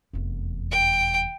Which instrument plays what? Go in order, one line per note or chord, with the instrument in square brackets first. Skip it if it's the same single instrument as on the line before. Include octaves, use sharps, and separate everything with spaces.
[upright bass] F1 E2
[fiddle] G5